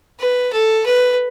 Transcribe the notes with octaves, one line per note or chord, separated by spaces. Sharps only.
B4
A4
B4